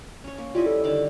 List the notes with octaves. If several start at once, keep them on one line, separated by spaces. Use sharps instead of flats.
C#4 C#5
A#3
G3 E4 F4 D#5
A4
D3 D#3 D6